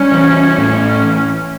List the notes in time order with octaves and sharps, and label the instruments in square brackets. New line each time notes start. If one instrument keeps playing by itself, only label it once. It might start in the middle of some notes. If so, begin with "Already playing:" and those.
Already playing: [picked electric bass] G3 [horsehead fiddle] C#4
[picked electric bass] E3
A2